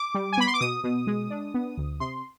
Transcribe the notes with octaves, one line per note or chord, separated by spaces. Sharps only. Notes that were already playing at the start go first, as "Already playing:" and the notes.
Already playing: D6
G3
G#5
B3 B5
C6
D6
B2 D#6
B2
G#3
D4
B3
D2
C3 C6